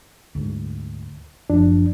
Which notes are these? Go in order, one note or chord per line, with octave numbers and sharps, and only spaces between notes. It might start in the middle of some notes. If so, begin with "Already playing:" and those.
D2 G#2
F#1 F#2 F3 D4